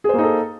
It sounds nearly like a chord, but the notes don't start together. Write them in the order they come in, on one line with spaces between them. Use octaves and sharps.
G#4 C5 A#3 D#4 A4